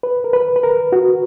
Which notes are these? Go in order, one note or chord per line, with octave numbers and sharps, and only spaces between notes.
B4
A#4
B4
B4
A#4
F#4